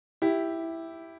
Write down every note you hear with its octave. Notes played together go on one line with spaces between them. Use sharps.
E4 G4